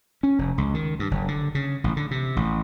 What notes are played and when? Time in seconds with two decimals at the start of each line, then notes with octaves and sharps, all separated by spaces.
0.23 C#4
0.39 F1
0.58 C#2
0.74 D#3
0.99 G2
1.11 F#1
1.28 D3
1.55 C#3
1.84 A1
1.97 D3
2.11 C3
2.36 A1